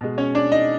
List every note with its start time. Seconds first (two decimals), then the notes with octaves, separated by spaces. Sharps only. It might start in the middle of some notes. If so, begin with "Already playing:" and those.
0.01 B2 G#3
0.18 C#4 C#5
0.35 D4 D5
0.52 D#4 D#5